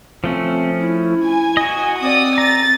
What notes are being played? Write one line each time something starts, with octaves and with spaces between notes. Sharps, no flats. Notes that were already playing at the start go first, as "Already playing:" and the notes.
F3 A3 C4 C#4
E4
G#5
F#4 D#5
C4 D5 D#6
A#5 A6